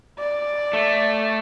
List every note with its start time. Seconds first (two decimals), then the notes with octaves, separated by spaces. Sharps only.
0.19 D5
0.73 A3